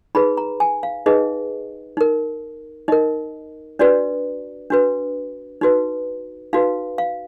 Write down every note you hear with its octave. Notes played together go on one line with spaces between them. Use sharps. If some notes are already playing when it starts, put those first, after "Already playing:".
D#4 G#4 B4 B5
A#5
G#5
F5
D#4 G#4 B4 D#5
D#4 A#4
D#4 A#4 D#5
D4 F#4 B4 D5
D4 F#4 B4
D#4 F#4 B4
D#4 F#4 B4 F5
F5